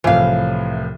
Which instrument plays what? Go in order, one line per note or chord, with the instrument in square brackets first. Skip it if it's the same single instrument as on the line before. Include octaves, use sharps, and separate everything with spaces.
[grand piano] C2 A2 F3 [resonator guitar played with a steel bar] E3 F5